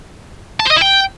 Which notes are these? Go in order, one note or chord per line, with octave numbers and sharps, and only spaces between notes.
A5
C5
D#5
E4
G5